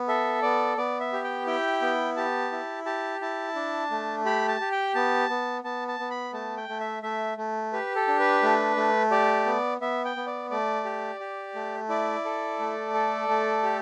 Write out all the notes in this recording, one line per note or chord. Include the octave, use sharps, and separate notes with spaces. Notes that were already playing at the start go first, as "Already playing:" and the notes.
Already playing: B3
A4 E5
B3 D5
B3 D5
E5
G4
G5
E4 G5
B3
G4 A5
E4
G4 A5
E4 A5
D4
A3
G4 B5
A5
G4
G5
B3 A5
B3
B3 A5
A5
B3
B5
A3 A5
G5
A3
E5
A3 E5
A3
G4 B4
A4
D4
B4
A3
A3
G4 D5
B3
B3 E5
G5
B3
D5
A3 D5
G4
G4
A3
E4 D5
A4
A3
A4
A3
G4